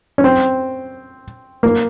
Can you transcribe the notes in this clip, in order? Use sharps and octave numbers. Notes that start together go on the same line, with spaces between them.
C#4
C4
A#3